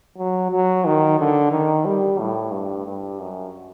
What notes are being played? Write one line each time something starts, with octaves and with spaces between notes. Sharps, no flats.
F#3
F#3
D#3
D3
D#3
G3
A2
G2
G2
F#2